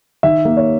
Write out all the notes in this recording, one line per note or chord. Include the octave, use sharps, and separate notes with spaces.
D#3 E5
A#3
C#5